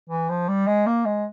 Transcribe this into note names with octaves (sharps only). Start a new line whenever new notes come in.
E3
F3
G3
G#3
A#3
G#3